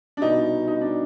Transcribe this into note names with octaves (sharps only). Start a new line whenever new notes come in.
D4
C2 B2 G3 D#4
D#4
D4